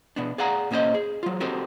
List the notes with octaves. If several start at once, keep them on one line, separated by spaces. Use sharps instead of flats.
B2 B3 D4
G#4 D5 F5 F#5 G#5 A#5
A#2 A#3 C#4 F4 C5 D#5
G#4
F#3 F4
C4 F#4 G4 A4 A#4